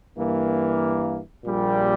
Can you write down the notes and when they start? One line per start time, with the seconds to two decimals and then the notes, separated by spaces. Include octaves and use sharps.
0.18 G2 E3 A#3
1.45 A#1 A#2 G3